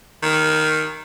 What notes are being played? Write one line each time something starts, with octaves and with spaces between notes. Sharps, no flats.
D#3